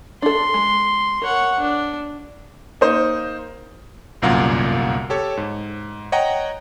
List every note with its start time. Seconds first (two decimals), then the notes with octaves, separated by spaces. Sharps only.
0.22 D4 A4 C6
0.54 G#3
1.22 A#4 C#5 F#5
1.60 D4
2.81 A#3 D#4 C5 D#5
4.22 G1 C2 F#2 A#2 F5 F#5
5.10 G4 A4 C#5
5.37 G#2
6.12 C#5 D#5 F#5 G5 A#5